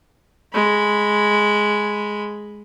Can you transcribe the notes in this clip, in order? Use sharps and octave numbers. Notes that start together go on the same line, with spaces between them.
G#3 B5